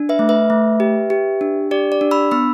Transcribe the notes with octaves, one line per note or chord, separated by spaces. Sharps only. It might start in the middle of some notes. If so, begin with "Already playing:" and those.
Already playing: D4
B4 E5
A3
B4 E5
A3
G4
G4
D4
G4 D5
D5
D4
B5 E6
B3 B5 E6